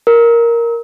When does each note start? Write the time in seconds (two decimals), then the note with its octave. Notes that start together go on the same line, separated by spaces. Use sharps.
0.07 A#4